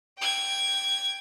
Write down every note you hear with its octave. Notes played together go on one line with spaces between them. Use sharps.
G5 G#6